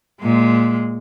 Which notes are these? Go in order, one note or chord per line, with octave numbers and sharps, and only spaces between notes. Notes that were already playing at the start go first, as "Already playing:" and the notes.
A#2 G#3